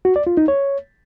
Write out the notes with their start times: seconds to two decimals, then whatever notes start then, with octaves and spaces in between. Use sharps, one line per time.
0.05 F#4
0.16 D5
0.27 F4
0.37 D#4
0.48 C#5